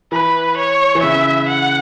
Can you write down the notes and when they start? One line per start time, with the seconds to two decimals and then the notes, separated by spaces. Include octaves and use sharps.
0.12 E3 B4
0.57 C#5
0.95 E3
1.03 C#3 E5
1.48 F#5